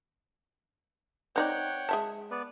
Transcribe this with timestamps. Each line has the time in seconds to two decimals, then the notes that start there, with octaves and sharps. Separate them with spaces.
1.36 C4 D#4 C#5 D5 F#5 G5
1.89 G#3 E5 A5
2.31 B3 B4 D5